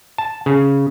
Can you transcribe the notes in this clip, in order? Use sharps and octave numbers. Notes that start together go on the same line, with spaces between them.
A5
C#3